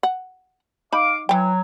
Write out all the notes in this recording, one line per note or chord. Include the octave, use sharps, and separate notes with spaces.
F#5
D#4 F5 B5 D6
E3 F#3 G5